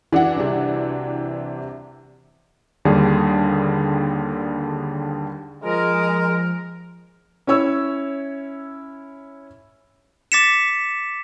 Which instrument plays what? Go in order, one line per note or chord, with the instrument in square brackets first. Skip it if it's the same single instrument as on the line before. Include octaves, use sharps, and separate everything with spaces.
[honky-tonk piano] E3 D4 F#4 [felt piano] E4 F#5
[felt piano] C2 C3
[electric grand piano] D#2 D3 G3 G#4
[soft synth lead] F3 [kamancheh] G#3 [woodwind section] A#4
[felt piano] C#4 E4 C#5 E6
[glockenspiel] D6 A6 B6 C#7 E7